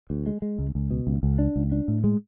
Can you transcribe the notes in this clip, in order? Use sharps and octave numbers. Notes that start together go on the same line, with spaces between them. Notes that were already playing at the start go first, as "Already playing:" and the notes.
D2
G#3
G#3
C#2
C#2
B2
C#2
C#2
D4
C#2
D4
A2
G#3